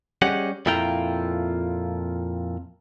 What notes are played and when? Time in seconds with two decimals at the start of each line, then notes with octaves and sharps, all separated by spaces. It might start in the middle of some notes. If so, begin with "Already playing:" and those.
0.22 G3 C#4 G4 G#4 D#5 F#5
0.66 F2 A#2 E4 F4 G5 A#5